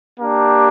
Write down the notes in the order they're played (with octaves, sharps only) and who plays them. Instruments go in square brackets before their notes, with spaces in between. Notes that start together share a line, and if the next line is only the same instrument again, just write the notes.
[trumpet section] A#3 D4 G4